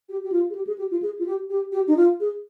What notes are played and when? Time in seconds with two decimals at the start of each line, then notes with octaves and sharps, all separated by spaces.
0.09 G4
0.23 G4
0.32 F4
0.50 G#4
0.55 G4
0.67 G#4
0.78 G4
0.91 F4
1.02 G#4
1.19 F4
1.26 G4
1.50 G4
1.72 G4
1.87 D#4
1.97 F4
2.20 G#4